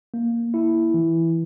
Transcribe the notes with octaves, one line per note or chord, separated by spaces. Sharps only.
A#3
E4
E3